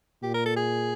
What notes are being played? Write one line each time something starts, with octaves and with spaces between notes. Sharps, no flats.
A#2 G4
A#4
A4
G#4